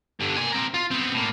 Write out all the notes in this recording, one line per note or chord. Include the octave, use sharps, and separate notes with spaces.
G2 D3
A#3 G#5
C4 A#4
F4
B3 C4
A2 A#3